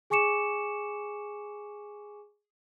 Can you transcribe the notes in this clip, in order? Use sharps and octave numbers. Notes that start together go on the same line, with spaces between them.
G#4 G#5 C#6 D6 C#7 E7